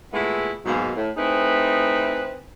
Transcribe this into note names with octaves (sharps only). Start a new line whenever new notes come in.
A#2 G#3 A3 B3 E4
G#2 B2 F#3 G#3 A#3
A2
A3 C4 D#4 E4 G#4 B4